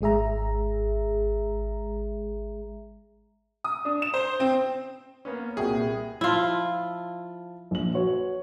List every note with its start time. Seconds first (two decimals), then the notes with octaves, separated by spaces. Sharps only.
0.01 G#1 G#3 G#4 E5 A#5
3.64 D#6
3.85 D4
4.02 E7
4.14 C5
4.40 C4
5.25 A#3 B3 C#4
5.57 C2 A#2 F#4 G#4 G5
6.21 F3 E4 F4 A5
7.71 A#1 F#7
7.94 F#4 B4 C#5